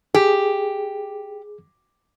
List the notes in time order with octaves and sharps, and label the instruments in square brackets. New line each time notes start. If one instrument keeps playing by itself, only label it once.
[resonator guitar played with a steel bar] G4 [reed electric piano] G#4